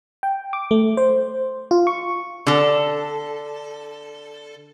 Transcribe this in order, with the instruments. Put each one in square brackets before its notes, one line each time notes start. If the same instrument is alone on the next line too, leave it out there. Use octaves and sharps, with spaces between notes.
[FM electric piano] G5
D6
A3
C5
F4
C#6
[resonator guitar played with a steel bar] D3 A4